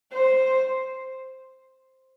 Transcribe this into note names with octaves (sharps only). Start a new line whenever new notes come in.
C5